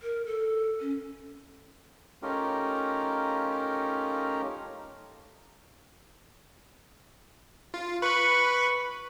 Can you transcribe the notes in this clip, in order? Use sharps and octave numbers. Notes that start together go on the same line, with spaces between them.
A#4
A4
C#4
A3 C#4 D#4 F4 G4 A#4
F4
B4 B5 C#6